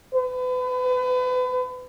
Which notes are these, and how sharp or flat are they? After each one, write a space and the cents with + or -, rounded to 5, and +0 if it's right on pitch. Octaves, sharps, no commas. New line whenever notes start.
B4 +35